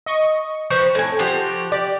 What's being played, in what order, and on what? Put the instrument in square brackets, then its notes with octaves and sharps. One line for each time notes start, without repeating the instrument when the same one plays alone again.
[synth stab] D#5 C#6
[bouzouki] F3 C4 B4 [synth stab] C#6
[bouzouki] A2 G#5
F3 F#4 G4
[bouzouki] G4 [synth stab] D5